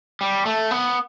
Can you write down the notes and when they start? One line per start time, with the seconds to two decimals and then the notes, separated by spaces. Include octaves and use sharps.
0.21 G3
0.46 A3
0.71 B3